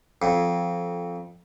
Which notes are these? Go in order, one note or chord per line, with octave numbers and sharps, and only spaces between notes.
F2